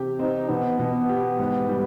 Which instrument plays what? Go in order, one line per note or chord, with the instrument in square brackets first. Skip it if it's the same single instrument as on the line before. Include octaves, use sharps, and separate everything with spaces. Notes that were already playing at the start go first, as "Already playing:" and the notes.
Already playing: [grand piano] C3 G4
[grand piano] C4 [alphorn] D#4
[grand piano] B2 [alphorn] B3
[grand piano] B2
G4
G#2
G3